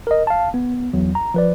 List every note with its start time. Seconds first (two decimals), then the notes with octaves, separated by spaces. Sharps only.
0.07 A#4 D#5
0.27 F5 A5
0.54 B3
0.93 E2 F#3
1.15 A#5
1.34 F3 B4 D5